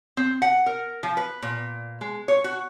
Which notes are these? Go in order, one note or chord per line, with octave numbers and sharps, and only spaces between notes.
C4
F#5
A#4
F3
B4
A#2
G#3
C#5
F#4